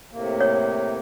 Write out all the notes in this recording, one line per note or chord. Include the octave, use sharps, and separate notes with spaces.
A2 C3 A#3
C#5